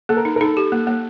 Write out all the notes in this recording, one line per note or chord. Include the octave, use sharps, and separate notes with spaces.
A#3 A4
A#4
D#4
A#4
D#4 A4
G4
A#3
A#3